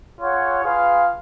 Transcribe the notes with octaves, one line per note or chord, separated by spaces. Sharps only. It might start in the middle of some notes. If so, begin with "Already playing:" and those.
F4 G#4 C#5 F#5
F4 G#4 B4 F5